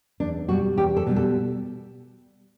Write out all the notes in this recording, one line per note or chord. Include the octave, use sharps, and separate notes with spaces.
E2 D4
B2 G3 F#4
E2 G4
A4
B2 G3
A4